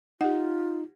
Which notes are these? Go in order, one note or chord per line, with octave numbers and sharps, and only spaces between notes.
D#4 F4 G4 F#5